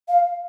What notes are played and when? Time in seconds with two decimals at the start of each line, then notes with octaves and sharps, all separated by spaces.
0.08 F5